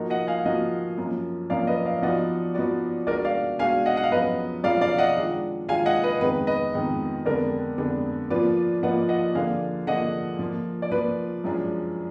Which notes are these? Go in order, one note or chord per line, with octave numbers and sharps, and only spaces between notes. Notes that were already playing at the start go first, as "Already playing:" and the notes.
Already playing: F3 A#3 D#4 F#4 A#4
D#5 F#5
F5 G#5
F3 A#3 D#4 F#4 A#4 D#5 F#5
F#2 F3 A#3
F#2 F3 A#3 D5 F5
B4 D#5
D5 F5
F3 B3 D#4 F#4 D5 D#5 F#5
F3 B3 D#4 F#4 D5
B2 G#3 D4 F#4 A#4 D5
D5 F5
B2 G#3 D4 F#4 F5 G#5
D#5 F#5
F#5
F5
F#2 F3 B3 F4 G#4 B4 D#5
F#2 F3 B3 F4 G#4 D5 F5
D5 F5
D#5 F#5
D#3 G#3 D4 F4
D#3 G#3 D4 F4 F5 G#5
D#5 F#5
B4 D#5
F2 D#3 G#3 B3 D#4 B4
B4 D#5
F2 D#3 G#3 B3 D#4
F2 D3 G#3 B3 D4 A#4 D5
F2 D3 G#3 B3 D4
F3 A#3 F4 B4 D5
F3 A#3 F4 B4 D5 D#5 F#5
D#5 F#5
D3 F3 A#3 D4 G#4 F5 G#5
D3 F3 A#3 D4 G#4 D#5 F#5
F3 A#3 F4
D5
F3 A#3 F4 B4
F#2 F3 G#3 D4 G#4